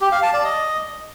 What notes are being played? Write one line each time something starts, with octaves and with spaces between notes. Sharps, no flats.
G4
F5
A5
D5
D#5